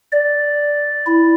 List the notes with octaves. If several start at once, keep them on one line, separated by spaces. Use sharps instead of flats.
D5
E4